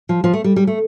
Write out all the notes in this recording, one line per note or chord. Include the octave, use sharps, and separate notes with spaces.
F3
F3
A3
G3
G3
A3